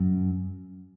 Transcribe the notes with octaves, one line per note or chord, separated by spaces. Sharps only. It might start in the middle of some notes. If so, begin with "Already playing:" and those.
Already playing: F#2